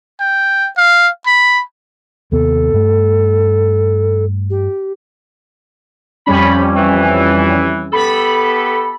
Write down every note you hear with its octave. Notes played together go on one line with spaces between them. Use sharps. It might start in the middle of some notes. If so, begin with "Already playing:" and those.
G5
F5
B5
D#2 C3 B3 A4
G2 A3
G4
F2 G3 C#4 B5
E3
B3 G4 A4 B5